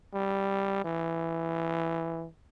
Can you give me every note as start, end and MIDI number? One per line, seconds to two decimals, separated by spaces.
0.14 0.80 55
0.85 2.27 52